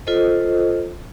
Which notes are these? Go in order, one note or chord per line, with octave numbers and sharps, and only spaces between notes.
F4 A4 C5 D#5